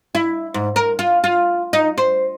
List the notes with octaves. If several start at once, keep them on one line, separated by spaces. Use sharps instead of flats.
E4
G#2
A#4
F4
F4
D#4
C5